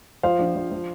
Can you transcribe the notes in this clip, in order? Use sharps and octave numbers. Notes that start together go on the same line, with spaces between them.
F3 C5 F5
A#1
F3
F3